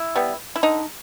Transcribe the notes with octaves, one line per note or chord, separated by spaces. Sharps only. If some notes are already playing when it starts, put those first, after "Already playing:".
Already playing: E4
G3 B3
E4
D3 D#4